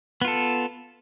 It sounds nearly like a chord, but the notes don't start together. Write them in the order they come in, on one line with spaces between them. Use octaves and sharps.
B3 F4 A4